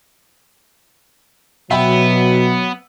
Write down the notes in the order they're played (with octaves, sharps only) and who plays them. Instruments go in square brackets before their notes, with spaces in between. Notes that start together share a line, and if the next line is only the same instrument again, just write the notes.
[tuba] B2 [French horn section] F#3 [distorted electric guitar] B3 [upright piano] E5 G5 B5